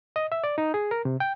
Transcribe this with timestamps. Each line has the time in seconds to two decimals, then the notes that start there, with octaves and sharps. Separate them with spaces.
0.16 D#5
0.32 E5
0.44 D5
0.58 D#4
0.74 G#4
0.91 A#4
1.05 C3
1.20 G5